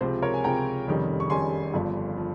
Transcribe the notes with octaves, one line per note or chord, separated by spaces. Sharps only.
C#2 C3 F3 C4 C5
A#4 C#5
G#5
C#2 C3 F3 C4 G5 A#5
F1 F2 D#3 G3 C#4
C#6
F1 F2 D#3 G3 C#4 G#5 C6
G1 G2 F3
F3